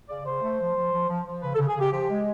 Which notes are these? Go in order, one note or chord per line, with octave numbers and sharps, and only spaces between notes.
C#3 D5
C#3 C5
A3
F3
F3
F3
F3
F3
C#3 B4
A4
C#3
G#4
C#3 G4
F3 G4
G#3